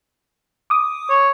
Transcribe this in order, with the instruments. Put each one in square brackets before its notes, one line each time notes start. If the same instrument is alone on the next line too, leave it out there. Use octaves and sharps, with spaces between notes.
[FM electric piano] D6 D#6
[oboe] C#5